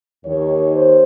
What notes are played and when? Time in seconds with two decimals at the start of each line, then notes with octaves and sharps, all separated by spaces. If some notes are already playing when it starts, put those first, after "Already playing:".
0.25 D#2 D#3 C#5
0.75 C5